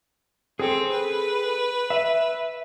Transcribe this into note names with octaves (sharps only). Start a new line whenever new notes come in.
C4 G#4 A4
B4
E5